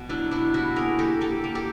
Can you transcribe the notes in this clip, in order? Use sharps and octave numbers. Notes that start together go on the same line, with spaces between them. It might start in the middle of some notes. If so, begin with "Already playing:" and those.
Already playing: B2
F#3 D4 E4
B2 D4 E4
G3 E4 F#4
A#3 G#4 A#4
A#3 G4 A4
A#3 G4 A4
A#3
G4 A4